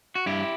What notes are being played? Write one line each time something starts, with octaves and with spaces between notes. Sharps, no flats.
F#4
G2 E4 G4